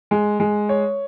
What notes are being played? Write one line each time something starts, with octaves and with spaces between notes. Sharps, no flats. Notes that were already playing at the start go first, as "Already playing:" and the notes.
G#3
G#3
C#5